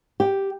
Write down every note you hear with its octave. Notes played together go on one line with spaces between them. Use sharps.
G4